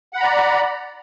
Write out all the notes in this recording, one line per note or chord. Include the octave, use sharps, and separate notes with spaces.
D5 F#5 A#5 B5